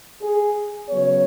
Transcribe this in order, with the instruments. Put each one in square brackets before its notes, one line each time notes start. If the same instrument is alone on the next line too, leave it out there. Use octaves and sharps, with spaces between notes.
[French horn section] G#4
C#3 F#3 B3 C#5